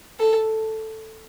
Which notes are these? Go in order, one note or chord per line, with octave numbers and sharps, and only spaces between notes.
A4